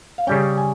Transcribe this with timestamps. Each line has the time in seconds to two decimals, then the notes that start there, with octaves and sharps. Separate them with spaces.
0.18 F5
0.27 C#3 G3 C#4 G5
0.58 G#5